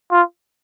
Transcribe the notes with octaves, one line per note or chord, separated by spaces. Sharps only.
F4